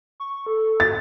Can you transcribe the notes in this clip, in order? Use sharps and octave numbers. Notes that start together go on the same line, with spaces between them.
C#6
A4
A6